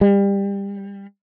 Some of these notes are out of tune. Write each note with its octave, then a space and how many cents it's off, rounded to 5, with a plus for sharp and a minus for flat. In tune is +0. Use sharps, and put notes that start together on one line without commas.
G3 +25